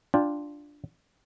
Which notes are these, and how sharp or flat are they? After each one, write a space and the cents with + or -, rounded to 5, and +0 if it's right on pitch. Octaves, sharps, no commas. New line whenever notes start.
D4 +0 F4 +0 G5 +10